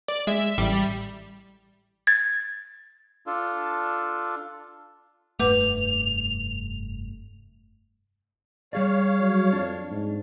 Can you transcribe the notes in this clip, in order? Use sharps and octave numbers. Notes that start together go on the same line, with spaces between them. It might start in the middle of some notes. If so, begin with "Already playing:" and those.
D5
G#3 E5
A1 G3
G#6 A6
D4 F4 A4
F1 G2 A3 B4 F#5 D6 F7
G3 G#4 C#5 D5 F5
F#3
F2 D4
G#2